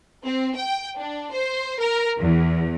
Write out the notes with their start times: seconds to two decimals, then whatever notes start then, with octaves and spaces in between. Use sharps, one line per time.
0.24 C4
0.55 G5
0.98 D4
1.32 C5
1.79 A#4
2.19 E2